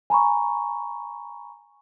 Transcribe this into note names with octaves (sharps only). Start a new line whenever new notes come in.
G#5 A#5 B5 C#6